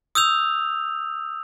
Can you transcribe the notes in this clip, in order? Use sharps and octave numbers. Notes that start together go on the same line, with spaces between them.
D#6 E6 G6 F7